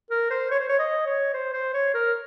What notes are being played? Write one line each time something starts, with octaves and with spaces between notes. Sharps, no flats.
A#4
C5
C#5
C5
C#5
D#5
C#5
C5
C5
C#5
A#4